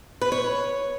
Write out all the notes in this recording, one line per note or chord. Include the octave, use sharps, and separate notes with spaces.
B4
C#5